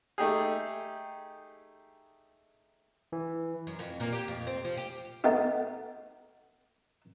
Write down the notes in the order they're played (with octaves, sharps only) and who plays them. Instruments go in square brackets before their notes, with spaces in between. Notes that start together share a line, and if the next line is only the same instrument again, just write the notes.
[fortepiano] A3 D#4 G4 G#4
[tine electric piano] E3
[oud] F#2
F2
A#2
G4
F2
C4
F3
G4
[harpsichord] A3 B3 D#4 G4